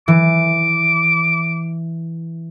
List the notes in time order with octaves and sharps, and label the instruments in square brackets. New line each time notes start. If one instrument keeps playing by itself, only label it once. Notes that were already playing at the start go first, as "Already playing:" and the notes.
[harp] E3 [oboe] D6